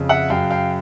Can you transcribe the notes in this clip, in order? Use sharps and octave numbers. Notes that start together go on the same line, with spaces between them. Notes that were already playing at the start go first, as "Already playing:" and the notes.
Already playing: F2 C#3
E5 F#5
F#2 F5 G5
F5 G5